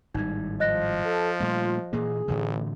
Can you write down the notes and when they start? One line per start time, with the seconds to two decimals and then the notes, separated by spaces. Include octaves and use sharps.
0.14 G#1 A2 G3 D#4 G#6
0.60 F3 D#5 F#6 A#6
1.06 A4
1.40 A#2 G3 A3 F4
1.93 A#2 E3 A#3 G#4
2.28 A1 A2 D3 E3